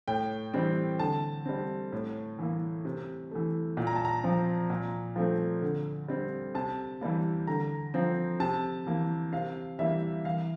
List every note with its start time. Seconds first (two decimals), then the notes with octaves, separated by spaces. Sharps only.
0.08 A2 G5
0.54 E3 G3 C4
0.99 D3 A5
1.46 G3 C4
1.93 A2
2.39 E3 A#3
2.85 C3
3.31 E3 A3
3.77 A#2
3.87 A#5
3.96 A5
4.05 A#5
4.23 F3 C4
4.70 A#2
5.16 F3 A3 C4
5.62 D3
6.08 G3 C4
6.55 C3 A5
7.01 E3 G3 A#3
7.47 D3 A#5
7.94 F3 C4
8.40 C3 A5
8.86 E3 A#3
9.32 C3 F5
9.79 E3 G3 A#3 E5
10.24 E3 F5